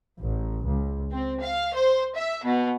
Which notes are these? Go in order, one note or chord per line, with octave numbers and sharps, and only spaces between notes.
A1
C#2
C4
F5
C5
E5
B2